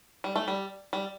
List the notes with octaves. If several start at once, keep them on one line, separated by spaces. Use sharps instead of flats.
G3
A3
G3
G3